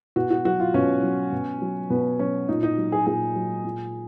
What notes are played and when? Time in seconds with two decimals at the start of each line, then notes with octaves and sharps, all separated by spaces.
0.16 B2 F#4
0.31 F#4
0.45 F#3 F#4
0.60 F4
0.74 B2 C#4
1.03 F#3
1.32 B2
1.62 F#3
1.90 B2 B3
2.19 F#3 C#4
2.49 A#2 D#4
2.63 D#4
2.78 F#3
2.92 G#4
3.06 A#2 G#4
3.36 F#3
3.64 A#2